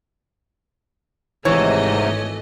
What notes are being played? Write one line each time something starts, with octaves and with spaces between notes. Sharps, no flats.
G#1 G#2 C3 E3 A3 C#5 D#5